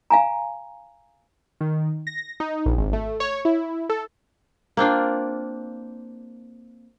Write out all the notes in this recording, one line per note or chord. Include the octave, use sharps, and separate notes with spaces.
F5 G#5 A#5
D#3
A#6
D#4
A#1
G#1
A3
C#5
E4
A4
A#3 C4 D4 F4